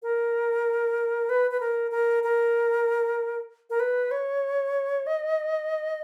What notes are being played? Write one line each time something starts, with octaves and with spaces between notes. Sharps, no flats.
A#4
B4
B4
A#4
A#4
A#4
A#4
B4
C#5
D#5